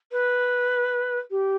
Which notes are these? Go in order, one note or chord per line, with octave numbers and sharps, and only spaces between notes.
B4
G4